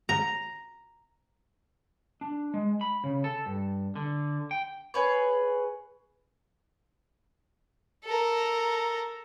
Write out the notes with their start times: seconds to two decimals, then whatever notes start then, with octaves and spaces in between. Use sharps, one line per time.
0.09 A#5
2.21 D4
2.54 G#3
2.81 B5
3.04 C#3
3.24 A4
3.46 G2
3.96 D3
4.51 G5
4.94 G#4 B4 C#5
8.05 A4 A#4